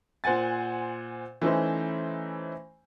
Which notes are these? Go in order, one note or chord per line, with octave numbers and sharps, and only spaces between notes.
A#2 C5 F#5 G#5 A6
E3 A3 C#4 D#4 E4 C5